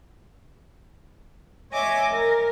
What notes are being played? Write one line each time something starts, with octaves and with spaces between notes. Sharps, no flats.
C#5 D#5 E5 G#5 D6
A#4